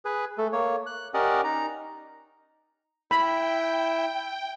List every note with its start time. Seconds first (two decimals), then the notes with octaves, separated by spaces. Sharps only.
0.05 G#4 B4
0.38 A3 A4
0.53 A#3 C#5
0.86 F#6
1.14 C#4 G4 A#4 D5 D#5 F#5
1.44 D#4 A#5
3.11 E4 E5 G5 B5